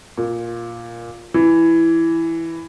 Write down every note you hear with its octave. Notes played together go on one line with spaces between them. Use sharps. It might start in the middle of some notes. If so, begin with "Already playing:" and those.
A#2
E3